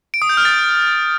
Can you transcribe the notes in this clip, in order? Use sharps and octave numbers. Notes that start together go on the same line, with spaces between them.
D7
D#6
G6
F6
A6